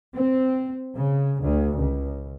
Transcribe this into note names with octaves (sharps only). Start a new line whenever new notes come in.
C4
C#3
D2
C#2